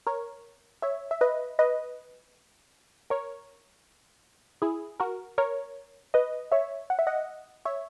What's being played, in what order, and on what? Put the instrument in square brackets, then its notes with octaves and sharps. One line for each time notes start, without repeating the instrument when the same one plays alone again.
[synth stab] A#4 C#5
C#5 E5
E5
B4 D#5
B4 D#5
A#4 C#5
E4 G#4
F#4 A#4
A#4 C#5
B4 D#5
C#5 E5
F#5
E5
D#5 F#5
C#5 E5